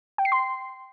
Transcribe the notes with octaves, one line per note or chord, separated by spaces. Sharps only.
G5
C7
C6